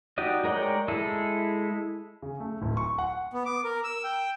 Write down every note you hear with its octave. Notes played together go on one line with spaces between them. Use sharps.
D#4 F#4 G4 D5 D#5
G#3 A#4 C#5 D5 G5
G#3 E4 G#4 A4
C#3
A3
D1
C#6
F#5
B3
D6
A#4
E6
G5